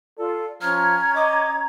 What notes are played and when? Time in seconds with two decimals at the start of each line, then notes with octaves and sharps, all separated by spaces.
0.18 F4 A4 D5
0.61 F3 C#4 A#5 F6 G#6
1.16 D#5 D6